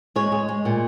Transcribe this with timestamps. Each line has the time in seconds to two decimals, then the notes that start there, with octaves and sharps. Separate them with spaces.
0.16 G#3 C#5
0.32 G#3
0.48 G#3
0.65 A#2